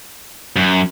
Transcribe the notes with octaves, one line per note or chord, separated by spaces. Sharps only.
F#2